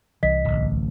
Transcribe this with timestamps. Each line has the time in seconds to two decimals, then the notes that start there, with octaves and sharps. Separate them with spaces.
0.23 C2 E3 D#5 B6
0.45 D1 A1